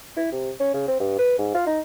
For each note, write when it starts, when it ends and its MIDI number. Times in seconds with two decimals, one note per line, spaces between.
0.17 0.30 64
0.32 0.50 48
0.60 0.71 61
0.74 0.85 49
0.88 0.97 60
1.00 1.15 43
1.19 1.37 71
1.38 1.50 44
1.54 1.64 65
1.67 1.80 63